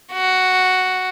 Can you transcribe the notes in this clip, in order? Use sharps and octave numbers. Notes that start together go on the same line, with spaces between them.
F#4